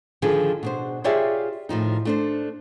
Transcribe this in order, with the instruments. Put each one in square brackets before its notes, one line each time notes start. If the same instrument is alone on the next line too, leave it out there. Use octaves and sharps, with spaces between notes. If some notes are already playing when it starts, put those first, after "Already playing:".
[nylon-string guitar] D3 D#3 F3 G#4 B4
B2 D4 C5
F4 G4 G#4 C#5 D5 E5
A2 D#3 F3 D#4
A3 D4 C5